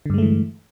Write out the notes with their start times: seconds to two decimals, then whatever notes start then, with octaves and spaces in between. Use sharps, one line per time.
0.06 D3
0.10 G2
0.14 G#3
0.18 A3
0.22 E3